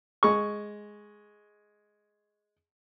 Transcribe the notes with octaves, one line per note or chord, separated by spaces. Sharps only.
G#3 C#6